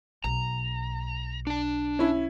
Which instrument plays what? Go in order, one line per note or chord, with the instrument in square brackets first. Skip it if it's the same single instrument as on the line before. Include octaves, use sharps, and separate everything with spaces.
[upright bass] B1 [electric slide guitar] A#5
[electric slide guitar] D4 A5
[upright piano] C#4 E4